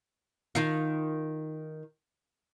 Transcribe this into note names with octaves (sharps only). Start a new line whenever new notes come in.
D#3 F4